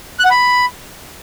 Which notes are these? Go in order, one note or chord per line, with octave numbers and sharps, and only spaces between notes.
F#6
F#5
B5